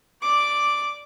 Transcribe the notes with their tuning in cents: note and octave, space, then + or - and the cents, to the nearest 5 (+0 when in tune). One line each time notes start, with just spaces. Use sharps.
D5 +0 D6 +0